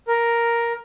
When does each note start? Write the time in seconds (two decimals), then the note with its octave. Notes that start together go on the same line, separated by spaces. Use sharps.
0.08 A#4